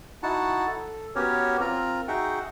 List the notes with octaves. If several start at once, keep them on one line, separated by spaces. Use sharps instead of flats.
D#4 E4 F#4 F#5 A5
A4
B3 C#4 F#4 G4 A#4 C#5
C4 F4 A#4 A#5
D#4 F#4 G#4 E5 F#5 G5